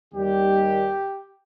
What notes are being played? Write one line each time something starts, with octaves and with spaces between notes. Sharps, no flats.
D#2 D#3 G3 G4